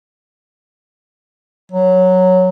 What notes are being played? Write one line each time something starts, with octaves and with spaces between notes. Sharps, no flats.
F#3